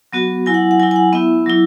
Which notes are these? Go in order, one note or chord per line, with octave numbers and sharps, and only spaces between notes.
F#3 B3 F#4
F#3 E4 G#5
F#5
F#5
F#3 E4 G#5
G#5
F#5
B3 E4 E5
F#3 E4